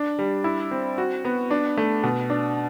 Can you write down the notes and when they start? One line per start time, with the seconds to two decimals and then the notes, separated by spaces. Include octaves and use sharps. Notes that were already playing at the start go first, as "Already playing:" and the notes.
Already playing: D4
0.19 G3
0.44 E4
0.71 C4
0.98 F#4
1.25 B3
1.51 D4
1.77 A3
2.03 B2
2.30 D4